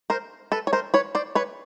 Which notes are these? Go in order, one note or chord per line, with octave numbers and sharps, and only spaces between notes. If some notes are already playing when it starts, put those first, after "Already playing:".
A#4 C5
A4 B4
C#5
A#4 C5
B4 C#5
C5 D5
B4 C#5